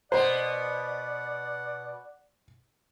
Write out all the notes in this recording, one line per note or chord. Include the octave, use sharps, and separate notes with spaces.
B2 B3 C5 D5 F#5